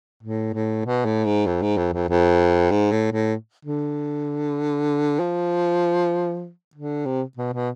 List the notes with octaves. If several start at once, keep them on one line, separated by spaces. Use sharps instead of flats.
A2
A2
B2
A2
G#2
F2
G#2
F2
F2
F2
G#2
A2
A2
D3
F3
D3
C3
B2
B2